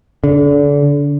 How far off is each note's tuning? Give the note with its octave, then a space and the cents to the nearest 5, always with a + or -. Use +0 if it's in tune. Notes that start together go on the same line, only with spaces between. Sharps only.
D3 -30